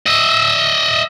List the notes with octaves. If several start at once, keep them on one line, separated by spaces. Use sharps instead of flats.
D#5 E5